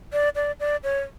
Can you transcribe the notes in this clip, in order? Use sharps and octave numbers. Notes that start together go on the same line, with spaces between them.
D5
D5
D5
C#5